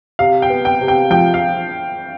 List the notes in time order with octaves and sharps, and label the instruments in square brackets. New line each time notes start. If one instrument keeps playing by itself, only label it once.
[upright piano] C3 [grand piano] F5
[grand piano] G5
[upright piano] B3
[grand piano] G5
[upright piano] C3
[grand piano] G5
[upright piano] F3 [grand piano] G5
[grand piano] F5